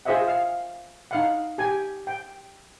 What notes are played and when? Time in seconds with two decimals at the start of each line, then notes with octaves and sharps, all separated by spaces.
0.05 F4 G#4 C5 D#5 E5 F#5
0.28 F5
1.11 D#4 F5 F#5
1.58 G4 G#5
2.07 G5